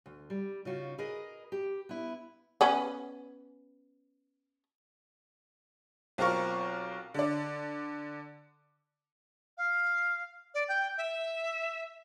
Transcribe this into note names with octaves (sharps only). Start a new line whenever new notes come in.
D2
G3
C#3 D#4 F4 F#4
G#4 A#4 B4 D#5
G4
B3 E4
B3 C#4
B1 C4 F4 A#4 C#6
D3 D5
F5
D5
G5
E5